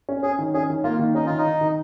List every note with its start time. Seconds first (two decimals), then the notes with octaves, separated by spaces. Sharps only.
0.09 C#4
0.23 C#4 G#4
0.39 D#3
0.54 C#4 G#4
0.70 D#3
0.84 A#3 F4
0.99 D#3
1.15 C#4 D#4
1.26 D#3 F4
1.38 D#4
1.45 D#3
1.61 D#3